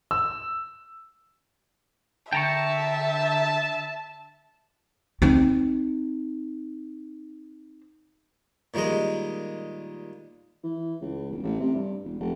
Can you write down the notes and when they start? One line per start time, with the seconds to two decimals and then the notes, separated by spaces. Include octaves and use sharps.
0.11 E6
2.33 D3 E5 G5 A5 A#5 C#6
5.22 C4 D#4
8.74 A#2 D#3 G3 G#3 D#5
10.63 E3
11.01 C#2
11.31 E1
11.43 A1
11.60 C3
11.75 G2
12.04 E1
12.20 F1